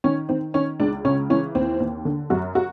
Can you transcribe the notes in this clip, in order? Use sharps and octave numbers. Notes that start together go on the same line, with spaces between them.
D#3 C#4
D#3 C4
D#3 C#4
C#2 D4
C#3 C#4
E3 C#4
D#2 C4
D#2
D3
F#2 F#4
F#4